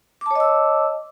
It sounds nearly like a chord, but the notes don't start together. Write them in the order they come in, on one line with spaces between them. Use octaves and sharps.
D6 A5 C#5 D#5 E6